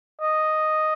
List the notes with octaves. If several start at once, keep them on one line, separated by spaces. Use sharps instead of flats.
D#5